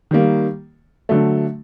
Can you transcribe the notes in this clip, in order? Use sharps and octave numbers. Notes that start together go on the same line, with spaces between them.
D#3 G3 A#3
D3 F#3 A3